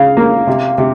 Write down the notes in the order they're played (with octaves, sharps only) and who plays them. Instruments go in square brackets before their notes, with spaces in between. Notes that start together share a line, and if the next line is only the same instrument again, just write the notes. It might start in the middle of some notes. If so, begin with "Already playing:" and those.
Already playing: [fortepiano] C#3 [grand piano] F5
[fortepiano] A#3
C3
C3